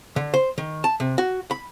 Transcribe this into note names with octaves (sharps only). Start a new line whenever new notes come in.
D3
C5
D#3
A5
C3
F#4
B5